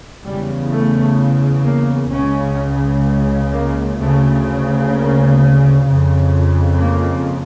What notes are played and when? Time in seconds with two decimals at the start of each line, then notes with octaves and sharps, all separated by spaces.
0.24 E2 C#3 G3
0.71 A3
1.64 A#3
2.11 C#2 C#3 C#4
3.51 A#3
3.98 D2 C#3 A3
4.91 A#3
5.85 F2 C#3
6.78 A#3